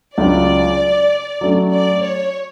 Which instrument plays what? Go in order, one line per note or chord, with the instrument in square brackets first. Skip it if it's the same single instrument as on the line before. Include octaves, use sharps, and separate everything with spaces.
[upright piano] C#2 C#3 F#3 C#4 [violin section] D5
[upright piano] F#3 A3 C#4
[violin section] D5
C#5